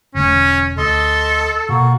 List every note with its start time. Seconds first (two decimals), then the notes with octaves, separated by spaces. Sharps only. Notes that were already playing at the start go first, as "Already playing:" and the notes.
0.15 E1 D3 G#3 C#4
0.78 D2 A4 D#5 C6
1.69 B2 A#3 F#4